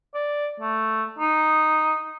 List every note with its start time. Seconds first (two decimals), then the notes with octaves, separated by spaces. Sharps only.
0.14 D5
0.60 A3
1.19 D#4